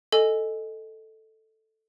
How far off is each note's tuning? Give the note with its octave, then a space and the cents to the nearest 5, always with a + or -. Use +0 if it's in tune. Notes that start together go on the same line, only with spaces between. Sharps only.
A4 +0 D#5 +0 G#5 +0